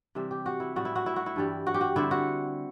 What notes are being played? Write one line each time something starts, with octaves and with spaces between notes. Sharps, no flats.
C3 E3 G3 E5
G4
F#4
E4
A2 G3 B3 F#4
E4
F#4
E4
F#4
E4
G2 E3 G3
F#4
G4
F#4
D3 G3 C4 E4
F#4